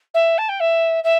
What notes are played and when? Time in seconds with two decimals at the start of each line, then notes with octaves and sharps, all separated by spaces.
0.14 E5
0.38 A5
0.49 G5
0.60 E5
1.04 E5